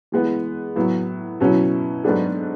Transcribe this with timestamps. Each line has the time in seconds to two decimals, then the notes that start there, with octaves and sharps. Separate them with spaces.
0.12 E3 G#3 B3
0.76 A2 F#3 B3
1.40 B2 F#3 C#4 E4
2.04 G#2 F#3 B3 D4 A4